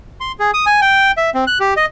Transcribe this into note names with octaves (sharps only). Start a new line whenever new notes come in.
C6
G#4
D#6
G#5
G5
E5
C4
F#6
G4
D#5